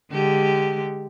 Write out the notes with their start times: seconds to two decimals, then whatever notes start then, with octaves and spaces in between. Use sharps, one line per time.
0.12 D3 G#3 G4